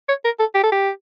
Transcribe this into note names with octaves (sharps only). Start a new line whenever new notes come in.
C#5
A#4
A4
G4
A4
G4